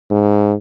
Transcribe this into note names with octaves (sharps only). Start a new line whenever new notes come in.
G#2